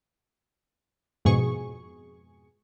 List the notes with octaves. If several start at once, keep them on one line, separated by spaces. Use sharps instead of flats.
F2 G#2 B2 G#4 C#6